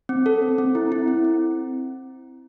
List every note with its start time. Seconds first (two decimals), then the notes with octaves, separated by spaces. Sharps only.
0.09 C4
0.26 A4
0.42 C4
0.58 C4
0.75 E4
0.92 E4
1.08 C4
1.24 C4